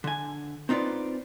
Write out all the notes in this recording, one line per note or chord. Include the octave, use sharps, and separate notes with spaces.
D3 G#5
C4 D#4 F4 B4 D5